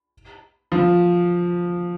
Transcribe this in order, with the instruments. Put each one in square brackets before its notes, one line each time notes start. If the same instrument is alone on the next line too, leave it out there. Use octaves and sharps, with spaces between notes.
[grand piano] F3